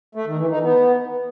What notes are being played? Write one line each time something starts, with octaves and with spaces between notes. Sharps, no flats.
A3
D#3
E3
D#4
B3